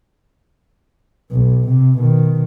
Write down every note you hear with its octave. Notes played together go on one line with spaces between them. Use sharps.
B1
C3
B2 D#3